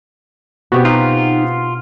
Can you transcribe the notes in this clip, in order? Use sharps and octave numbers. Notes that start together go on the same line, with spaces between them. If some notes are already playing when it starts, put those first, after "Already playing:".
B2 B3 C4 F#4 G4
D#4 F4 D#5 F#5